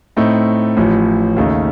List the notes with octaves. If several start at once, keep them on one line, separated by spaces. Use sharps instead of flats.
A2 A3 C4 D#4
A1 A2 F3
D#2 C#3 A3 D#4